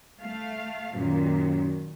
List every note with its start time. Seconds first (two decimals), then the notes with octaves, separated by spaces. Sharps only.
0.21 A3 F5
0.95 F#2 A#2 D#3